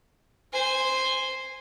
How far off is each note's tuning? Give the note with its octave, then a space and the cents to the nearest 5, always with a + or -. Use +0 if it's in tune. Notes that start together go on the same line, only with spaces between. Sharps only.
C5 +0 G#5 -15